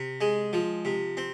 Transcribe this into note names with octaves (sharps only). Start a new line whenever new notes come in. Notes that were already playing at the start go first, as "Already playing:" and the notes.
Already playing: C3
G#3
F3
C3
C4